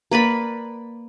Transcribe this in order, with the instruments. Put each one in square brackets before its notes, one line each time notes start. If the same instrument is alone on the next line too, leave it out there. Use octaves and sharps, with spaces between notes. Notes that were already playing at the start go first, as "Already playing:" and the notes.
[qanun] A#3 B4 D5 B5